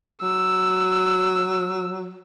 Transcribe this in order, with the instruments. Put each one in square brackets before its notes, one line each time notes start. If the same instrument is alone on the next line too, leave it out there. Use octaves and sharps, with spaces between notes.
[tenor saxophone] F#3 [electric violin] E6